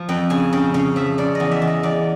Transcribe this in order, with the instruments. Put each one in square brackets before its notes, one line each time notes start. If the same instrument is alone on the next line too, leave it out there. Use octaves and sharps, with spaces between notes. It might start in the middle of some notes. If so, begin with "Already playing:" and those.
Already playing: [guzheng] F3
F2 G5
C#3 G#5
C#3 G5
C#3 F5
F3 E5
C#3 D5
D#5
E2
E5
E2
D#5
E2 D5